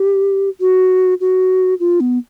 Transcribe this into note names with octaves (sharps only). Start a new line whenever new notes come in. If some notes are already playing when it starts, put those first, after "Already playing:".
Already playing: G4
F#4
F#4
F4
B3